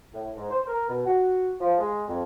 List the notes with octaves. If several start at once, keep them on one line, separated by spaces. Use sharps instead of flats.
A2
G#2
C5
A#4
B2
F#4
F3
G#3
F2